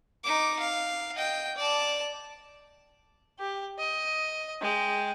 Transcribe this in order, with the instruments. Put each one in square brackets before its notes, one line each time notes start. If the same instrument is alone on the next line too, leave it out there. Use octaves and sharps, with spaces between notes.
[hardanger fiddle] D#4 D6
F5
D#5 G5
D5 A5
[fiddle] G4
D#5
G#3 G5